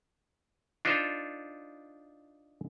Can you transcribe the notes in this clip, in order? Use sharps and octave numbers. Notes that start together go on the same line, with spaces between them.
D4 D#4 F4 A4 C5